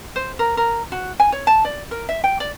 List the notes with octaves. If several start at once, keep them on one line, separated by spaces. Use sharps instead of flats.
C5
A#4
A#4
F#4
G#5
C#5
A5
D5
A#4
E5
G5
D5